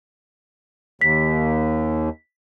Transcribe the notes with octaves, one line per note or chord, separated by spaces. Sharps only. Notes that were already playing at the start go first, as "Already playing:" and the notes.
D#2 B6